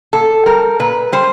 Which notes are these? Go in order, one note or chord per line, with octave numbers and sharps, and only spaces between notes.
A#2 A4
G3 A#4
A#2 B4
G3 C5